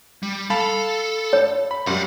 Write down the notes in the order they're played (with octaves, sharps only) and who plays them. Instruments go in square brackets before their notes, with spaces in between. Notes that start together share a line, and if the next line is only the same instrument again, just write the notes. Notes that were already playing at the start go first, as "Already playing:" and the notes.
[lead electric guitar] G3
[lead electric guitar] A4 [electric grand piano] F5 A5 B5
[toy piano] C#5
[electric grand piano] B5
[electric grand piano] F#2 F#3 G3 [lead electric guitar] F5 F#5